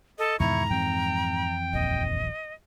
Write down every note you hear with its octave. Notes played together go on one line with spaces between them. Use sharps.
A4 D#5
E2 G#2 B2 D#3 E4 A#5 C#6
F2 E3 C4 G5
D#1 A#1 D#2 D#5